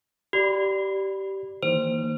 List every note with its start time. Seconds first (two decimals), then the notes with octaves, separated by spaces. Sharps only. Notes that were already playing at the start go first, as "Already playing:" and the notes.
0.33 G4 D5 B5
1.63 D#3 E3 A#3 C5